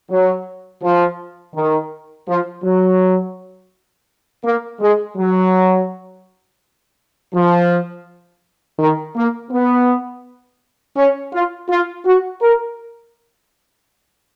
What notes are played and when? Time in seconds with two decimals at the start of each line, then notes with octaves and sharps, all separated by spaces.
0.11 F#3
0.83 F3
1.55 D#3
2.28 F3
2.63 F#3
4.45 A#3
4.80 G#3
5.17 F#3
7.34 F3
8.79 D#3
9.16 A#3
9.51 B3
10.97 C#4
11.33 F4
11.69 F4
12.05 F#4
12.42 A#4